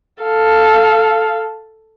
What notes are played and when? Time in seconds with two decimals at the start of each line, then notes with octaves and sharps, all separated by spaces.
0.22 A4 F5